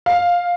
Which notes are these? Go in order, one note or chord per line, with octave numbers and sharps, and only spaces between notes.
F5